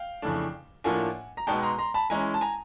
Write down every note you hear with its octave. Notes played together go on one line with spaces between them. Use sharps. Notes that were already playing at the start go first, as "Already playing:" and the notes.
Already playing: F5 G5
F2 C#3 E3 A3 D4
A2 F3 A#3 D4 F4 F#5 G#5
A#5
B2 G#3 B3 D#4 G5 A5
A#5 C6
A#5 C6
A5 B5
E3 G#3 C#4 E4 G#5 A#5
A5
G#5 A#5